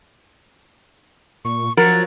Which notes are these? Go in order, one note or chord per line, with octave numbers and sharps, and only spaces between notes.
A#2 C#6
F3 F#3 F#4 A#4 A6